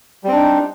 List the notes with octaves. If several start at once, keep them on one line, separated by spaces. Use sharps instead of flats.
G3 C4 D4 D#4